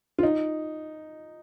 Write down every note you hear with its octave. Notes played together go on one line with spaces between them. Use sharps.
F4
D#4